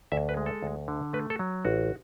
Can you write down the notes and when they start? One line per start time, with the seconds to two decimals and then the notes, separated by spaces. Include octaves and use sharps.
0.12 D2 E5
0.29 B4
0.37 G#3
0.46 A4
0.63 D2
0.88 D3
1.13 A3 B4
1.30 A4
1.39 F#3
1.65 A1 F#4